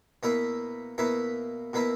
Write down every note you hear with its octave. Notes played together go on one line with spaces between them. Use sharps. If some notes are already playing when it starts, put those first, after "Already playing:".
B2 A#3 E4 B4 E5
B2 A#3 E4 B4 E5
B2 A#3 E4 B4 E5